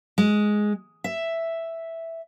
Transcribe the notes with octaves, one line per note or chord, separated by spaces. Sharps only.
G#3
E5